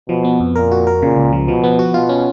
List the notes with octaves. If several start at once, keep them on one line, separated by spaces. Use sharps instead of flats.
B2 F3
B3
F2
A#2 A#4
F#4
A#4
A#2 C#3
C#2
F3
B2 F3
B3
F#4
B2 F4
C#4